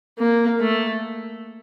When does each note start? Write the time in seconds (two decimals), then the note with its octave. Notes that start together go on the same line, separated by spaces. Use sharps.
0.18 A#3
0.60 A3